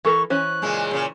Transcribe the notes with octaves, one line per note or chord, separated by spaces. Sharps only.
E3 A4 A#4 C#6
E3 C#4 C5 F#6
A#2 C#3 G#3
A#2 C#3